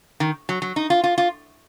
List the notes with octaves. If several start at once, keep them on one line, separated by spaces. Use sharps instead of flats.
D#3
F#3
F#3
D#4
F4
F4
F4